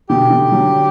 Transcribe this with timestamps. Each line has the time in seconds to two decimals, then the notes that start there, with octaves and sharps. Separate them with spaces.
0.10 B2 D3 G4
0.30 B2 D3
0.52 D3 F#3